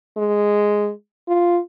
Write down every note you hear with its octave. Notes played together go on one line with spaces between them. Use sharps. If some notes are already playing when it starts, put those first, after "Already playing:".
G#3
F4